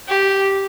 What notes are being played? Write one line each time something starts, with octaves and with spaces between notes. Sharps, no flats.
G4